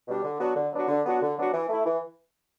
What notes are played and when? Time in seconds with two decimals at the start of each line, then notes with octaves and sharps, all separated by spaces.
0.08 B2 G3 D4
0.24 D3
0.40 F#3 B3 D4 F#4
0.56 D3
0.73 F#3 B3 D4 F#4
0.88 D3
1.05 F#3 B3 D4 F#4
1.22 D3
1.37 F#3 B3 D4 F#4
1.53 E3
1.69 A3 E4
1.86 E3